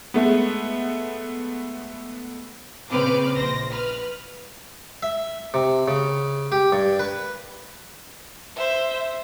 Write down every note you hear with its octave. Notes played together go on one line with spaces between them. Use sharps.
G#3 A3 B3
A#2 C#3 C4 B4 D6 F6
A#1 C5 A#6
B4 F6
E5
C3
C#3
G4
G2
B4
C5 E5